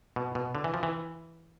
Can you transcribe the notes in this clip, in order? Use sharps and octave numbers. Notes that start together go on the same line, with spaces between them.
B2
B2
D3
E3
F3
E3